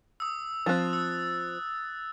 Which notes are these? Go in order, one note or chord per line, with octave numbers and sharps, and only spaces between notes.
D#6 E6
F3 C4 F#6 A6
E6